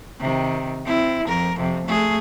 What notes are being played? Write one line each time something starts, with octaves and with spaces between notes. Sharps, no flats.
C3 D#3
C4 E4
F2 A#4
F2 C3
A3 G#4